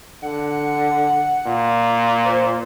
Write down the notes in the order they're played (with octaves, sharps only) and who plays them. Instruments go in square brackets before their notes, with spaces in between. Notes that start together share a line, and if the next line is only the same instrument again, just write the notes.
[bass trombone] D3 [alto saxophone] F#5
[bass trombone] A#2
[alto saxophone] C5